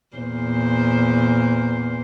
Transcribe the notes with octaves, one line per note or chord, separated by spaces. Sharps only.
E2 A#2 C5